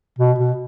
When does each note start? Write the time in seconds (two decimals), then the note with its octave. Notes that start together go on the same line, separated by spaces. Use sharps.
0.19 B2
0.39 B2